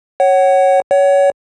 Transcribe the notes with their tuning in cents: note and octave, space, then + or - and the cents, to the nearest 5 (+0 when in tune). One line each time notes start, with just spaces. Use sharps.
C#5 -10 F#5 +25
C#5 +20 F#5 +35